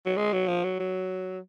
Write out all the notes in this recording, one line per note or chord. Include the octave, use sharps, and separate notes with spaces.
F#3
G#3
F#3
F3
F#3
F#3